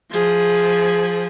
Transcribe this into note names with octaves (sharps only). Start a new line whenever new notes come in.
F3 G#4